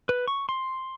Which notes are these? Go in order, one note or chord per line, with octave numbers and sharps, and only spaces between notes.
B4
C#6
C6